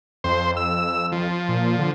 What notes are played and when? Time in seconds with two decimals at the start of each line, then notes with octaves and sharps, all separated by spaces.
0.24 F2 C5
0.57 E6
1.12 F3
1.49 A#2
1.79 D3